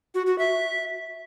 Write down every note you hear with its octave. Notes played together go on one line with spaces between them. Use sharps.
F#4
F#4
E5